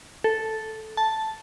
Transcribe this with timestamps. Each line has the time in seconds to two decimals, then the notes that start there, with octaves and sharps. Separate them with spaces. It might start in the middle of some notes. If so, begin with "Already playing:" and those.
0.24 A4
0.97 A5